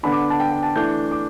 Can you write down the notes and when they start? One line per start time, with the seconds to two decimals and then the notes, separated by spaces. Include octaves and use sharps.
0.03 D3 B3 D4 B5
0.12 D6
0.30 A5
0.40 G5
0.52 G5
0.63 A5
0.75 E3 A3 D4 G6
1.11 D6